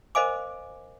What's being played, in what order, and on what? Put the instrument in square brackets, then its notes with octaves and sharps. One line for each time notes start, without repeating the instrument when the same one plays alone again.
[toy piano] A#4 C5 D#5 F5 G#5 D6